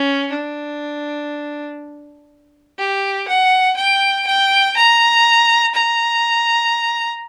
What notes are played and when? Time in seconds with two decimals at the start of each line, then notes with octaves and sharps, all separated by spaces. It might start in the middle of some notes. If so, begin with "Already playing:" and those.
Already playing: C#4
0.32 D4
2.78 G4
3.28 F#5
3.77 G5
4.27 G5
4.76 A#5
5.74 A#5